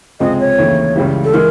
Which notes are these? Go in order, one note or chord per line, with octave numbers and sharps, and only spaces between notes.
C#2 C3 F3 G#3 C4 D#5
C#5
D#2 C#3 E3 A3
C#2 C#3 E3 G3
A4
E3 G#3 A#4